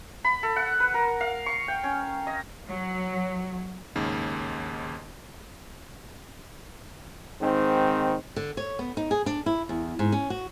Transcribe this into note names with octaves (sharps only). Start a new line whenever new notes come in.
B5
A4
F#5
B4
A#4
F5
C#6
G5
C#4
D#5
F#3
D#2 G#2 C#3
G#2 D#3 C4
D3
C#5
B3
D#4
G#4
D4
E4
E2
G#2
C#4
F#4